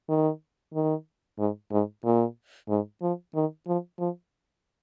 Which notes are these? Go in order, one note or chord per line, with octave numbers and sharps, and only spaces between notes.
D#3
D#3
G#2
G#2
A#2
G#2
F3
D#3
F3
F3